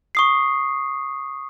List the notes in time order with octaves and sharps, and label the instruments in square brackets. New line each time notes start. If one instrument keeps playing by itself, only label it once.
[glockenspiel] C#6 D#6 C7